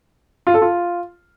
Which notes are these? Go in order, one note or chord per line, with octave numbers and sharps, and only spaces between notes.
F4
A4
F4